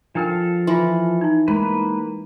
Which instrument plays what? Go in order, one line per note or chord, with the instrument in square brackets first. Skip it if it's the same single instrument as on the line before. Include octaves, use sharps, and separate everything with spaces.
[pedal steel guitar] F3 A4 F5 [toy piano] D4 A#4 G5
[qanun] E3 [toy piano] E4 F4 C6
[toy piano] D#4 E4
[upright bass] G#3 [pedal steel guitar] A#3 B4